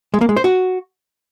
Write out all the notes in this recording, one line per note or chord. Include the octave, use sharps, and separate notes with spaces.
G#3
A#3
G#3
C5
F#4